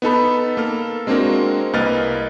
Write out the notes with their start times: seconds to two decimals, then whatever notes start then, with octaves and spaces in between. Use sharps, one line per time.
0.02 B3 D#4 A4 B5
0.57 A#3 A4 F6
1.07 G#3 A#3 C4 D4 F#4 A#4
1.73 C2 A#3 B4 D#5 F6 A6